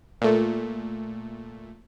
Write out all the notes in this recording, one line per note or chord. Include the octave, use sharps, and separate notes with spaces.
A#2 A3